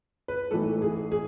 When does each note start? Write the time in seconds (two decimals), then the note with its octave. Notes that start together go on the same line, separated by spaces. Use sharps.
0.28 B4
0.51 A1 G#2 E3 A4
0.82 G#4
1.12 G#4